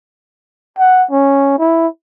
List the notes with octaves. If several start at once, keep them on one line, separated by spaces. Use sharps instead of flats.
F#5
C#4
E4